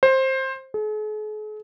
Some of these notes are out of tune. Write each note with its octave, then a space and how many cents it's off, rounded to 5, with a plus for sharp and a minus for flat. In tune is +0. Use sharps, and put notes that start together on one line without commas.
C5 +15
G#4 +45